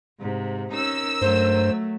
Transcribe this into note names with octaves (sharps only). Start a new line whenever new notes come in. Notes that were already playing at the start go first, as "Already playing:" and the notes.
G#2 C3
C#4 D#4 A#4 E6
G2 F#3 A3 C5